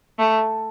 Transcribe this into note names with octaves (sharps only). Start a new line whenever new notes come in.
A3